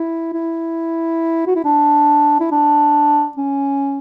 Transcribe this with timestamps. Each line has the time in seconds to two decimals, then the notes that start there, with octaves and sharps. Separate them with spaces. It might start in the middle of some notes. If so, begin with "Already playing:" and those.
Already playing: E4
0.33 E4
1.47 F#4
1.55 E4
1.64 D4
2.40 E4
2.51 D4
3.37 C#4